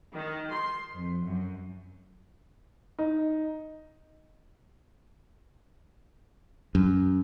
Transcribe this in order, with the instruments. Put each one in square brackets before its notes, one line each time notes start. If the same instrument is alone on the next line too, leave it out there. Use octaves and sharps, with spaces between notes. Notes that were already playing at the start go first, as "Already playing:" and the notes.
[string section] D#3
C6
F2
F#2
[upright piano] D#4
[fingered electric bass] F#2